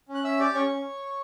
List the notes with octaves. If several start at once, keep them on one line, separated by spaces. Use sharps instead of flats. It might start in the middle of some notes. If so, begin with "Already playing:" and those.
C#4
F#6
C#4 E5 E6
G4 D5 D6
C#4 C#5 C#6
C#4